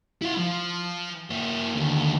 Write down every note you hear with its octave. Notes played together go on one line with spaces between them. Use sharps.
E4 F5
F3
A#3 E4
D#2 D3